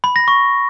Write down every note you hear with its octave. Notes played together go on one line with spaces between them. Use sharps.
B5
A#6
C#6